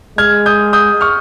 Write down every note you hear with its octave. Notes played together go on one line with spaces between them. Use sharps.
G#3 F6 G#6
D#6 G6
D#6 G6
C#6 F6